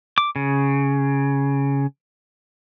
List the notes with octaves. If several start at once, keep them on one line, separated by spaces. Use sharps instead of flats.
D6
C#3